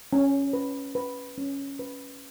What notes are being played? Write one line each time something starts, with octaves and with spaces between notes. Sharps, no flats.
C#4
B4
B4
C#4
B4